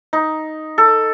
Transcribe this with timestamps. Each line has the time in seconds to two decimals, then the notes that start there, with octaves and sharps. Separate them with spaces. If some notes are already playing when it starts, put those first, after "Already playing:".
0.13 D#4
0.78 A4